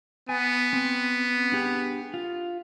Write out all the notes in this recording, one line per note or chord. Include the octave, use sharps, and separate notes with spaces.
B3 G#5
C4
D4 G4 G#4
F4